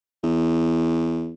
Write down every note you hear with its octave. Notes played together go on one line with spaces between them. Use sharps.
E2